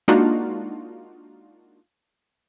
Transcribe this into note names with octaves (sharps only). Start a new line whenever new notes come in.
G#3 A#3 D4 D#4 F4 F#4